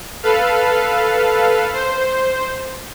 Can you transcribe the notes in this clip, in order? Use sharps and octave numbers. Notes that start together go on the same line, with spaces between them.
A4 B4 F5
C5